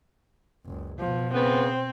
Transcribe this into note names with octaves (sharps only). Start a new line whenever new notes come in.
F#1 C#2
B2 F3
C#3 B3 C4